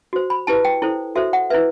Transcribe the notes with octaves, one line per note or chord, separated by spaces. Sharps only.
F#4 C5
B5
E4 G4 B4 A5
G5
E4 A4 C5
F#4 A4 C5 E5
F#5
E4 B4 E5